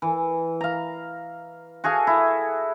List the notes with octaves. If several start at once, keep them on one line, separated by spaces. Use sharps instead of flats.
E3
F5 A#5
F#4 G#4 A4 F5
E4